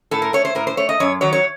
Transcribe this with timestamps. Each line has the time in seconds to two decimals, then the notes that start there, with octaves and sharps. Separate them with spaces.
0.11 A2 A4
0.22 A#4
0.33 A3 C#5
0.45 C5
0.55 A2 A#4
0.67 C5
0.77 A3 C#5
0.89 D#5
1.00 F#2 C#5
1.21 D#3 F#3 C#5
1.33 C#5